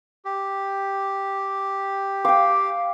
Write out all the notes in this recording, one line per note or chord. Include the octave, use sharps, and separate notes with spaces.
G4
F5 G5 D6